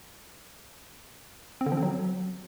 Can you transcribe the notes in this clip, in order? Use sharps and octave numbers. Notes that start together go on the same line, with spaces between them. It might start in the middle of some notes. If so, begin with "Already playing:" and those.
C4
D3
F3
C4
F#3